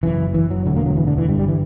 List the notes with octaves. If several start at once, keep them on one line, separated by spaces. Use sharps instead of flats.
F#1 F#2 C#3 E3
E3
F#3
E1 D2 D3 F#3
A#3
F#3
E3
D3
E3
G1 G2 D3 G3
G3
E3